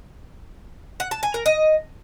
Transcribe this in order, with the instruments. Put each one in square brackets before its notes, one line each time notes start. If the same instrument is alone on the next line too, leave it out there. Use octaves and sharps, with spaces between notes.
[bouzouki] F#5
A5
G#5
A#4
D#5